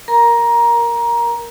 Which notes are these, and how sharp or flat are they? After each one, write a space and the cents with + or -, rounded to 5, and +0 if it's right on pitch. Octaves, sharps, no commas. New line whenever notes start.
A#4 +0 A#5 +20